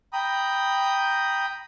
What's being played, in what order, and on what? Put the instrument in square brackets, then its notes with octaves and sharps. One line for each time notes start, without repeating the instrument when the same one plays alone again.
[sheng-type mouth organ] G5 A#5 B5 D#6